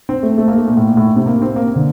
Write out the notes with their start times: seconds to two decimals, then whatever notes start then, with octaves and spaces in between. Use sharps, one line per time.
0.09 C4
0.23 A3
0.38 A3
0.48 A#3
0.58 A3
0.67 A#2
0.77 A2
0.87 A#2
0.97 A2
1.07 A#2
1.16 C3
1.26 A#3
1.42 C4
1.56 A#3
1.76 D3